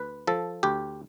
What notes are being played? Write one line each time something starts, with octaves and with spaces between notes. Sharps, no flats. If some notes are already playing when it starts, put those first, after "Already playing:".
Already playing: D2 B4
F3 A4
D2 G4